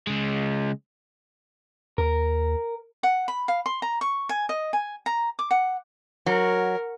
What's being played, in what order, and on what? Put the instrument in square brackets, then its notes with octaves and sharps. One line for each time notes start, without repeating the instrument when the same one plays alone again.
[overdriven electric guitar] C#3 G#3
[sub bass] D#2 [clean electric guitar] A#4
[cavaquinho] F#5
B5
F5
C6
A#5
C#6
G#5
D#5
G#5
A#5
D6
F#5
[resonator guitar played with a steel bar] F#3 [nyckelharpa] A#4